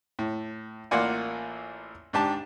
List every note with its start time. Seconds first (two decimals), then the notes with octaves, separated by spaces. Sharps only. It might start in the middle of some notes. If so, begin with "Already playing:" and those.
0.19 A2
0.91 A1 A#3 F4 D5 F#5 G#5
2.13 G#2 D4 G4 A5